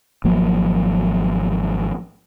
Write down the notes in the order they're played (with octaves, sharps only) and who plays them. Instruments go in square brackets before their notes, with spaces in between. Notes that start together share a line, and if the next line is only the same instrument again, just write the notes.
[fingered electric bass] G#1 F3 F#3 A#3